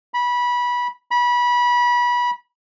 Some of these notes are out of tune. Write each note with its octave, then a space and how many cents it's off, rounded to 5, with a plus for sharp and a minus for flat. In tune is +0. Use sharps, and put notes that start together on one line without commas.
B5 -20
B5 -25